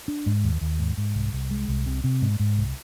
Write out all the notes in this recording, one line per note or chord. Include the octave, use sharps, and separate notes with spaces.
D4
G#2
D#2
D#2
G#2
G#2
C2
C2
G#3
C2
C3
C3
G#2
G#2
C2